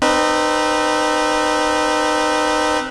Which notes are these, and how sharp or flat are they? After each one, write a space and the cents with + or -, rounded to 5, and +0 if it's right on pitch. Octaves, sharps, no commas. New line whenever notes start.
C4 +0 D#4 -30 B4 -15